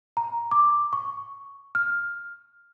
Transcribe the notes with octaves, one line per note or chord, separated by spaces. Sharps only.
A#5
D6
C#6
F6